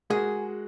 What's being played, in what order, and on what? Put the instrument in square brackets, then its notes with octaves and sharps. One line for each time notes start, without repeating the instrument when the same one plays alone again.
[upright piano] G#3 F#4 A#4 [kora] G#4